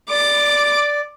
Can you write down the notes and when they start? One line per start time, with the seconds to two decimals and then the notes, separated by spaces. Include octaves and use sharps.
0.10 D5 D6